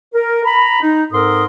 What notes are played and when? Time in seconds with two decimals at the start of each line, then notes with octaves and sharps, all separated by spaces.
0.14 A#4
0.45 A#5 B5
0.81 D#4
1.12 G#2 C4 A4 A#4 C6 D#6